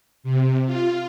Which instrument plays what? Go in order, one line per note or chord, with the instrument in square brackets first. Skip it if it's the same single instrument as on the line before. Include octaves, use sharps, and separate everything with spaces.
[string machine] C3
F4